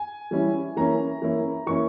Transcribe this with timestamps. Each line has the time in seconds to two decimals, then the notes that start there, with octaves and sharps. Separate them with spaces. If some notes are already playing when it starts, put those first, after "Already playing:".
Already playing: G#5
0.31 E3 G3 C#4 E4
0.77 E3 A#3 C#4 E4 A#5
1.22 E3 A#3 C#4 E4
1.66 E3 A#3 C#4 E4 C#6